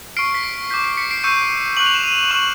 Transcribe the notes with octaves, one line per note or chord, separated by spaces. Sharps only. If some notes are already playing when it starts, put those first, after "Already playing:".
C#6 F6 C7 D7
B6
C7
D6 G6 B6
C7
B6 C#7
C7 D7
C#6 E6 G6 C#7 D#7
C#6 F#6 F#7
F7
E7
D#7 F7
C#6 F6 E7 F#7